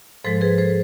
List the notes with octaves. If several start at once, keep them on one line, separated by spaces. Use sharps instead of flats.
G#2 F3 G#3 A4 C5
G#4 B4
A4 C5